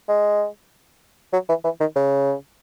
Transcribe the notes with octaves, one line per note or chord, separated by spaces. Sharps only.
G#3
F#3
E3
E3
D#3
C#3